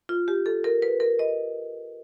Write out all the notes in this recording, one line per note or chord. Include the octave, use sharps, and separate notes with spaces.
F4
G4
A4
A#4
B4
A#4
D#5